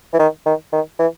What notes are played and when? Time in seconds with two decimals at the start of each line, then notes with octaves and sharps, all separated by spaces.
0.13 E3
0.19 D#3
0.46 D#3
0.73 D#3
0.99 E3